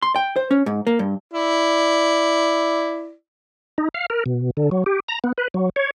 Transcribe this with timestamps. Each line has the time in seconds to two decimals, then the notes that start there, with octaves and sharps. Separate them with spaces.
0.02 C6
0.16 G5
0.36 C5
0.51 C#4
0.66 G#2
0.87 A#3
0.99 G2
1.33 E4 D5
3.78 D#4
3.94 F5
4.10 A#4
4.26 B2
4.57 D3
4.71 F#3
4.86 G4
5.08 A#5
5.24 B3
5.38 B4
5.54 F#3
5.76 C#5